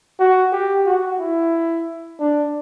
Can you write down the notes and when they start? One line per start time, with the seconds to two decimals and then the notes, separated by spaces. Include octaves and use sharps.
0.19 F#4
0.52 G4
0.86 F#4
1.19 E4
2.19 D4